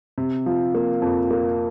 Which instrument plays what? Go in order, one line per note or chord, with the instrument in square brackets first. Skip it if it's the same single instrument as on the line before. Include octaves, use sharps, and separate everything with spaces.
[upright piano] C3
F3
A#3
F2
A#3